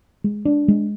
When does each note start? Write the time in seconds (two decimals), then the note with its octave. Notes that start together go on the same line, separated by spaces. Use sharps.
0.24 G#3
0.45 D4
0.68 G#3